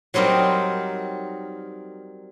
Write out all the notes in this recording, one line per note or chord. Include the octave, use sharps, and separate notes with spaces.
F#3 G3 C4 D#4 A#4